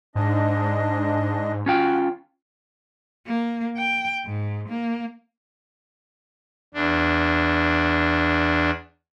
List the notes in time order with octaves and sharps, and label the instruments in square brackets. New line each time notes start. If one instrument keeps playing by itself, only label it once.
[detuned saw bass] G#2 [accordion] D4 D#5
[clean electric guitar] C#4 F4 G5 [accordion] F#4
[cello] A#3
G5
G#2
A#3
[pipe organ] E2 D4